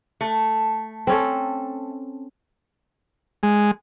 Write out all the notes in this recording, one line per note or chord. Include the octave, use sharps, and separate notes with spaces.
A3
C4 C#4 A4
G#3